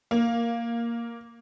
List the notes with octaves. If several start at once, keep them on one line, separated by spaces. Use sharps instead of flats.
A#3